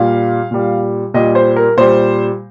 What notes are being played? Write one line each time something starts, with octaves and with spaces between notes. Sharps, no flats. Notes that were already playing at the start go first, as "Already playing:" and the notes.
Already playing: A#2 G3 F5
A#2 G3
A#2 G3 D#5
C5
A#4
A#2 G3 C5